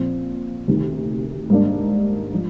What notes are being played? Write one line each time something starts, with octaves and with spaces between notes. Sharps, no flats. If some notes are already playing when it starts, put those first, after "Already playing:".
Already playing: A#2 F3 C4
D2 C3 D#3
G#2 G3 A#3 D4
F3